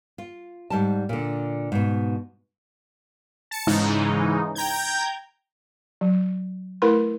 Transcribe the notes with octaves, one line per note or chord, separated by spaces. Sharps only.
F4
G#2 G3 A5
A#2 D3
G#2 B2
A5 C#7
G#2 C#3 E3 G#3 D#4
G5 A#5 G6 G#6
F#3
A3 E4 A#4 B4 B5 C6